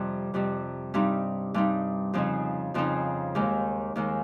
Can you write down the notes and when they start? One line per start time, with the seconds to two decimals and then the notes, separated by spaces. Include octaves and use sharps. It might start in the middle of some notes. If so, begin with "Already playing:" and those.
Already playing: F2 C3 G3
0.34 F2 C3 G3
0.94 G2 G3 C4 D#4
1.54 G2 G3 C4 D#4
2.14 F2 C#3 F3 C4 D#4
2.74 F2 C#3 F3 C4 D#4
3.35 D#2 D#3 G#3
3.96 D#2 D#3 G#3